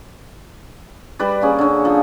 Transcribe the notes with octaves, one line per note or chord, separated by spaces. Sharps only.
G3 B4 D5
A#3 C#4 G#4
D3 C#4
F3